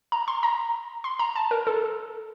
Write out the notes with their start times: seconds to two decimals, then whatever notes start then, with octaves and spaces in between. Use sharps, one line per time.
0.12 A#5
0.28 C6
0.43 A#5
1.04 C6
1.19 A#5
1.36 A5
1.51 A#4
1.67 A4